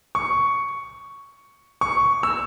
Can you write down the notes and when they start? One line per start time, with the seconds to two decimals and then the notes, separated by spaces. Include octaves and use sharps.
0.15 C#6
1.81 C#6
2.23 E6